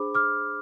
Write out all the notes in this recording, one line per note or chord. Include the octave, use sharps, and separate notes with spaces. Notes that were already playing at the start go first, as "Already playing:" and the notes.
Already playing: D4 G#4 C5 B5 D6
D6 F6